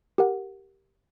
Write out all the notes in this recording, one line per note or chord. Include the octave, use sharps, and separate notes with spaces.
G4 A#4 F#5